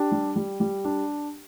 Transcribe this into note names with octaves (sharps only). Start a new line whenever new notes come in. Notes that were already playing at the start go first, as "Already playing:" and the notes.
Already playing: D4 G4 G5
G3
G3
G3
D4